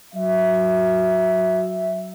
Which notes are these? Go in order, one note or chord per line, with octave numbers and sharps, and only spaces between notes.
F#3 E5